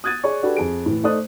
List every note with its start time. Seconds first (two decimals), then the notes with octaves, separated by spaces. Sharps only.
0.04 D#6 F#6 G#6 A6 D#7
0.24 G#4 C#5 D5 C#6
0.43 D4 F#4 G4 A4 B4
0.57 F2 G#4 D7
0.86 A2 E3
1.03 A3 D#4 C5 D5 D#6 F#6